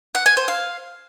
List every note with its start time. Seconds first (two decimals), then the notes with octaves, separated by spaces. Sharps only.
0.15 F#5
0.26 G#5
0.37 C5
0.48 F5